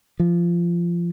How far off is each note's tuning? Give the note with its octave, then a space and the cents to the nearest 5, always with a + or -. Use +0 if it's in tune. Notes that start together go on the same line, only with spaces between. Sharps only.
F3 -20